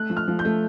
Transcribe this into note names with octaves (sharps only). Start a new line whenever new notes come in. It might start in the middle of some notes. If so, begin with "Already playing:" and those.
Already playing: A3 F#6
F3
F6
F3
G6
A3